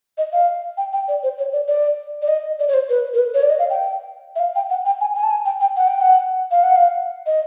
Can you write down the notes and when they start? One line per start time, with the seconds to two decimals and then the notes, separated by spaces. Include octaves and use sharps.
0.18 D#5
0.33 F5
0.77 G5
0.93 G5
1.08 D5
1.23 C5
1.39 C#5
1.53 D5
1.68 D5
2.22 D5
2.28 D#5
2.59 D5
2.68 C#5
2.74 C5
2.89 B4
3.14 A#4
3.19 B4
3.34 C#5
3.43 D5
3.50 D#5
3.59 F5
3.70 G5
4.36 E5
4.40 F5
4.56 G5
4.70 F#5
4.85 G5
5.01 G#5
5.15 G#5
5.24 A5
5.30 G#5
5.45 G5
5.61 G5
5.76 F#5
5.88 G5
6.01 F#5
6.51 F5
6.63 F#5
6.76 F5
7.26 D#5